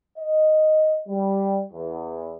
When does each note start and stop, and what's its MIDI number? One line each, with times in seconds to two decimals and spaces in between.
0.18 1.01 75
1.08 1.62 55
1.73 2.36 40